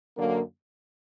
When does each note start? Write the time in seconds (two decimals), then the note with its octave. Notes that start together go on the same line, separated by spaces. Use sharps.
0.18 F#2 D3 F#3 A#3